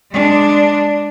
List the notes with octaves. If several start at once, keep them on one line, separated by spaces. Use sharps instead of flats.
G#3 D4